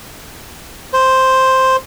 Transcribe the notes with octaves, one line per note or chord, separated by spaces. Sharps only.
C5